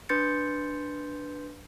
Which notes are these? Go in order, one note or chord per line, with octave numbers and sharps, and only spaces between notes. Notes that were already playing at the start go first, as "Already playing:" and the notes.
D4 B4 C6 G6 A6 C#7